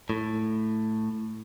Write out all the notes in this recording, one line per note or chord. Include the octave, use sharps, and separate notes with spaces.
A2